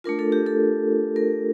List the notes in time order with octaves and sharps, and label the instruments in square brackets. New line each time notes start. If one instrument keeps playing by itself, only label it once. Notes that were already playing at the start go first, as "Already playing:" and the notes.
[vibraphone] A3 D4 F4 A#4
A4
G4
A4
A#4